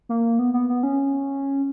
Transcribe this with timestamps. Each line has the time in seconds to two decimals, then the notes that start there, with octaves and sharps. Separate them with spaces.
0.09 A#3
0.39 B3
0.54 B3
0.69 B3
0.83 C#4